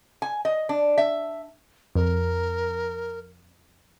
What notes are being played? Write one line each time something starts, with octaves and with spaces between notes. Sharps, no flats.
G#5
D#5
D4
E5
F2 A#4